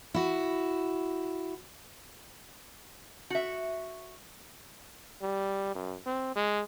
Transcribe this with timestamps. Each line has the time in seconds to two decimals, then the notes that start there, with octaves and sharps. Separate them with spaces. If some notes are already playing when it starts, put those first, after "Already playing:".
0.14 E4 F#4
3.30 F#4 E5
5.22 G3
5.75 F#2
6.06 C4
6.36 G#3